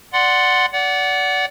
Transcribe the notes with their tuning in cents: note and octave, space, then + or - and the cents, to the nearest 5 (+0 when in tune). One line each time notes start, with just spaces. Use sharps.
D5 +0 F#5 +0 C6 +0
D5 -25 F#5 +10